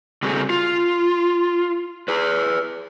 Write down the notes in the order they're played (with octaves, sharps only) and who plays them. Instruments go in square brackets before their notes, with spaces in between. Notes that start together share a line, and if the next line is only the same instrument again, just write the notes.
[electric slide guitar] C#3 G3 C4 F#4 G#4 A4
F4
G#4 B4